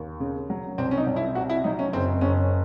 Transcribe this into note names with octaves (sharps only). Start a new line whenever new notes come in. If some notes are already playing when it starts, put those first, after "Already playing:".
Already playing: D#2
C#3
F#3
C2 C4
C#4
D#4
C2
E4
C3 F#4
E4
F#3 D#4
C#4
F#1 C4
F#1 C#4